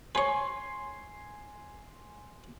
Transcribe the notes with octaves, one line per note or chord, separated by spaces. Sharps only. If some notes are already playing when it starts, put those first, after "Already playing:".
B4 C#5 G#5 C6